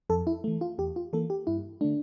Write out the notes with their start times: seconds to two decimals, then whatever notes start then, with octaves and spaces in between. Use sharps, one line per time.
0.09 F2 A4
0.27 E4
0.44 E3 A3
0.61 F4
0.78 E2 G4
0.96 F4
1.13 E3 A#3 A4
1.30 G4
1.47 G2 E4
1.81 D3 A3 D4